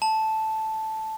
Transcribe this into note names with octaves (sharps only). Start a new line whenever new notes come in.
A5